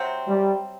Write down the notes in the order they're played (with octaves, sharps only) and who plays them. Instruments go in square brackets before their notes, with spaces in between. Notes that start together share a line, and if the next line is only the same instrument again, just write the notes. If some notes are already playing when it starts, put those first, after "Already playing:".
Already playing: [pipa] C3 F#3 C4
[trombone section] G3